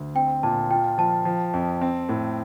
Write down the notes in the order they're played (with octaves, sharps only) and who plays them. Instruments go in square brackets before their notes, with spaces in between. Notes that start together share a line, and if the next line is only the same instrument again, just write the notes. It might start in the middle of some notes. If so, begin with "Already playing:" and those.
Already playing: [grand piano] D2
[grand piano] C4 [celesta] G5
[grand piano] A#2 [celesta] A5
[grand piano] F4 [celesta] G5
[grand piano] F3 [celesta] A5
[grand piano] F3
F2
C4
A2